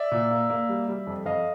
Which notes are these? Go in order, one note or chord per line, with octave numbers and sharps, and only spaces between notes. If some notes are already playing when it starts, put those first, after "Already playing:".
Already playing: D5 E5
A#2
A#3
A#3
G3
G3
F2
F2 D#5 F5